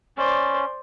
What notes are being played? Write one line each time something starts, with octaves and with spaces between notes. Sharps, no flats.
C#4 C5 D5